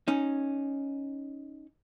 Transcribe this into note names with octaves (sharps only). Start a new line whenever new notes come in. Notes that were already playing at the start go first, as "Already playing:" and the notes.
C#4 D#4